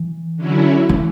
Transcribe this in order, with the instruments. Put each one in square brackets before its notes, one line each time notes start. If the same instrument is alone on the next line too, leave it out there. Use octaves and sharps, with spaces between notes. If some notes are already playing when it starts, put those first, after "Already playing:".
Already playing: [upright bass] E3
[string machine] D3 F#3 C#4 E4
[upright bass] E3